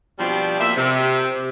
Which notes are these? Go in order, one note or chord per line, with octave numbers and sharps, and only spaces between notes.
B2 F3 G3 C4 D4 G4
F3 A#3 G4 E5
C3